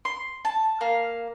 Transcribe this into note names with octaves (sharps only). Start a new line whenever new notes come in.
C6
A5
A#3 F5